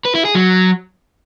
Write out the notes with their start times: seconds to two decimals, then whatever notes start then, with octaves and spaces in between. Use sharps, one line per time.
0.05 B4
0.15 E4
0.25 G#4
0.35 F#3